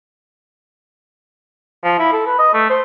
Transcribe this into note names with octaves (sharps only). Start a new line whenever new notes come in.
F3
E4
A4
B4
D#5
A3
C5